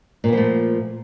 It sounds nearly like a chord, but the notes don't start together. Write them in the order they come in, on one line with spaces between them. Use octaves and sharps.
A#2 B3 F3 A3